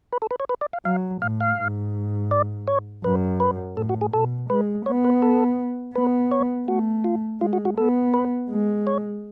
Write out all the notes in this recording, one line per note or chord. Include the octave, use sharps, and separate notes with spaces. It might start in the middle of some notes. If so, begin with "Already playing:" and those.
B4
A4
B4
C#5
B4
D5
F5
F#3 F5
A2 F5
F5
G#2
D5
C#5
F#2 B4
B4
A2 A4
F#4
G#4
B2 A4
G#3 B4
B3 C#5
B4
A4
B3 B4
C#5
A3 F#4
F4
G#3 F4
F#4
F#4
B3 A4
B4
G#3
C#5